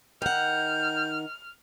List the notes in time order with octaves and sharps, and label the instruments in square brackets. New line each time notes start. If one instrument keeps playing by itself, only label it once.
[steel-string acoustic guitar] D#3 F#5 [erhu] F6 [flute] G6